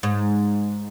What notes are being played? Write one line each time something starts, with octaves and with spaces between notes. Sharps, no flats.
G#2